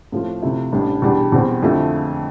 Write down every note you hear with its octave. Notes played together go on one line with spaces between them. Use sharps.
A2 F3 A3 C4 F4
C3 F3 A3 C4 E4
A1 A2 G3 D4
E2 B2 G3 D4 G4
E2 B2 G3 C4 G4
F2 D3 F3 A3 E4